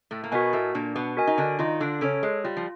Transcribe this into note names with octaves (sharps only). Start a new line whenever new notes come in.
A2 A3
A#3
B2 B3 F#4 A#4 D#5 G#5
A2 A3
A#2 A#3 D4
B2 B3
F#4 A#4 D#5 G#5
D#4
D3 D4
D#3 D#4 F4
D3 D4
C#3 C#4 A4 C#5
G#3
G3 F4
F3